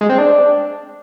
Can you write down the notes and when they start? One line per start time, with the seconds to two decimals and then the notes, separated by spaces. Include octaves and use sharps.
0.01 G#3
0.09 C4
0.18 D4